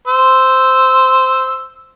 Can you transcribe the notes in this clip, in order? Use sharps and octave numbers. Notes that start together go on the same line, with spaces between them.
C5 E6